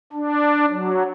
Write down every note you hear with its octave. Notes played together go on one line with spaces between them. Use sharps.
D4
F#3